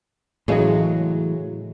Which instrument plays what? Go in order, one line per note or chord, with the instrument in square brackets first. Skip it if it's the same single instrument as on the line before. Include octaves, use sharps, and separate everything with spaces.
[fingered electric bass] A2 E3 F#3 [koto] C#3 G#3